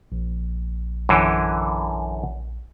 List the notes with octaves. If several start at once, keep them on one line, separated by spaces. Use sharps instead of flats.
A#1
F#2 D3 E3